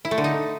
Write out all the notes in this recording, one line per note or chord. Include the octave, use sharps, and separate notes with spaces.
E4
A3
D3
D#4